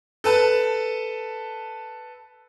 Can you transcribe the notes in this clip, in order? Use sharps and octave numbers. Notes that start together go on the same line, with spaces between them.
A4 B4 A5